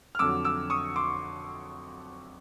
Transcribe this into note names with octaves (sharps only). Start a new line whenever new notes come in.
F6
F2 D3 F#3 D6 E6
D6 E6
C#6 D#6
C6 D6